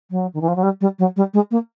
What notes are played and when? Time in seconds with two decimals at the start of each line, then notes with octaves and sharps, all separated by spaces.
0.11 F#3
0.34 D#3
0.41 E3
0.48 F3
0.56 F#3
0.63 G3
0.81 G3
0.99 F#3
1.16 G3
1.34 G#3
1.51 A#3